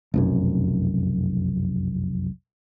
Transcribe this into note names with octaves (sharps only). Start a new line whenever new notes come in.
F1 B1 F#2